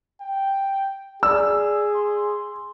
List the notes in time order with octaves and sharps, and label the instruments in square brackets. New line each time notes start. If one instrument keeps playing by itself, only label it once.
[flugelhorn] G5
[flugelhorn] G#4 [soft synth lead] D5 [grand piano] E6
[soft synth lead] C6